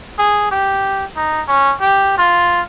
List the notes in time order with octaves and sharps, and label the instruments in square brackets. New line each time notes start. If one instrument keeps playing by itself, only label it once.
[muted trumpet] G#4
G4
D#4
C#4
G4
F4